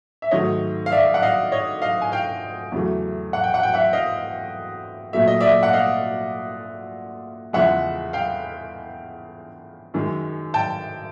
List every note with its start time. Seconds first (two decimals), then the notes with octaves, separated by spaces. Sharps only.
0.22 E5
0.31 G#2 D#3 F#3 A3 C#5 D#5
0.86 F5
0.92 D5 E5
1.14 F#5
1.22 D#5 F5
1.52 C#5 D#5
1.82 D#5 F5
2.01 G#5
2.12 F5 G5
2.72 E2 C#3 F#3 A3
3.33 F#5
3.44 G5
3.54 F#5
3.63 G5
3.74 E5 F#5
3.93 D#5 F5
5.13 A#2 F#3 A3 E5
5.28 D#5
5.40 D5 E5
5.63 F#5
5.73 D#5 F5
7.53 E2 C#3 F3 G#3 E5 F#5
8.13 F5 G5
9.94 F#2 D#3 G#3
10.54 G5 A5